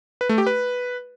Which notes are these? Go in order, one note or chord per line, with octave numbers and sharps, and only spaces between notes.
B4
A3
G4
B4